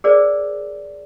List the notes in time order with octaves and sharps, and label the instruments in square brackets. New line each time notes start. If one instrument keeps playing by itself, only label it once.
[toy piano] G#4 A#4 C5 D5